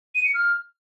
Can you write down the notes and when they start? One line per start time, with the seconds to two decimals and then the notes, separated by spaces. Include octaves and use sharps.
0.15 D#7
0.25 C#7
0.34 F6